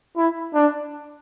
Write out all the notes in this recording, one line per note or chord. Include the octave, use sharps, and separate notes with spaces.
E4
D4